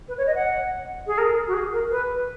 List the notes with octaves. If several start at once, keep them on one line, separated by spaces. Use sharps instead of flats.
B4
C#5
D#5
F#5
G#4
A#4
F#4
G#4
A#4
B4